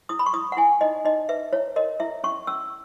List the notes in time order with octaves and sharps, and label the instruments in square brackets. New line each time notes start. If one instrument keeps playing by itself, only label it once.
[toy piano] E4 D#6
B5
C#6
E4 D#6
F#5
E4 G#5
D#4 D#5
D#4 D#5
B4 E5
E4 C#5
A#4 D#5
E4 E5
C#4 C#6
C#4 E6